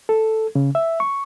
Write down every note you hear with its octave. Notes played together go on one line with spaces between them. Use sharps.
A4
C#3
E5
C#6